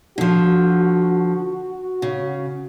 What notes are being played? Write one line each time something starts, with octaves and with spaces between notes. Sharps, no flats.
D3 F3 F#4
C#3